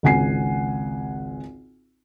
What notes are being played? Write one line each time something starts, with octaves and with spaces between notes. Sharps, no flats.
G#1 C#2 F#5 G#5 C7